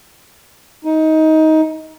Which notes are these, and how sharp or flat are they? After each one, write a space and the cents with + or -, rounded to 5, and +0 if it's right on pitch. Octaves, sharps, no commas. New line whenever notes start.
D#4 +20